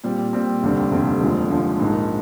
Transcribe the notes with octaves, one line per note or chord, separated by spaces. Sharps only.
A#2 G3 C4
A#2 G3 C4
F1 D#2 D3 G3 C4
F1 D#2 D3 G3 C4
F1 D#2 D3 F3 G#3
F1 D#2 D3 F3 G#3
A#1 G#2 D#3 G#3